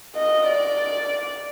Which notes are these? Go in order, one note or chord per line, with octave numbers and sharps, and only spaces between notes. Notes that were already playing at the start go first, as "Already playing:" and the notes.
D#5
D5